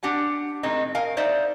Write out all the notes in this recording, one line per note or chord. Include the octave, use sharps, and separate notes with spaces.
D4 G4 F#5 G#5
A2 D#3 G#3 C4 D#4
A#4 D#5 F5 G#5
D#4 C5 D5 E5